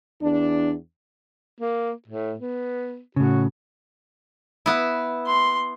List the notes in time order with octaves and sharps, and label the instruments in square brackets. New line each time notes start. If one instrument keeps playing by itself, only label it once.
[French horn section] E2 D4
[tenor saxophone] A#3
A2
B3
[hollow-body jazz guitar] A2 C#3 [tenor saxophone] F#4
[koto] B3 E4
[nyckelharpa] C6